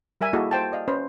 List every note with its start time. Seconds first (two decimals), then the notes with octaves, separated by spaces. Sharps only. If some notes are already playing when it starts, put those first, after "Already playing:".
0.21 G3 A#4 E5 G#5
0.33 A#3 E4 F#4 G#4 A4 D#5
0.51 C5 G5 A5
0.72 D5 D#5 F5
0.88 C#4 B4 C5